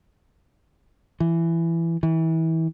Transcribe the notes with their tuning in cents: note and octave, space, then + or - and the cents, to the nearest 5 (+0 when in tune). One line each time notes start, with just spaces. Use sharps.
E3 +15
E3 -30